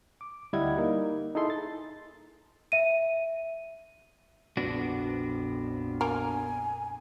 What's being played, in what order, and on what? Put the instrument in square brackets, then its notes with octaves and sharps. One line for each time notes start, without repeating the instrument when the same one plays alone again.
[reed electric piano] D6
D2 G3 E4 D#5 F#5 G#6
A#3 D#4 A#4
D#4 E4 G#4 A4 C6
A6
[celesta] E5 D#7
[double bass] A#1 F2 [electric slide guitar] B3 D4 F#4
[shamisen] A#3 A#4 [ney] G#5